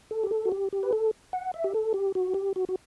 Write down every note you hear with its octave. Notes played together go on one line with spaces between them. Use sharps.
A4
G4
A4
F#4
G4
G4
B4
A4
F#5
E5
G4
A4
G4
F#4
G4
F#4
F#4